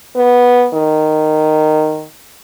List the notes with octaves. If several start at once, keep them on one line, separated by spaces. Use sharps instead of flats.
B3
D#3